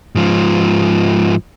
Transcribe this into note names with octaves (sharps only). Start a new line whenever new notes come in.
G#2 F3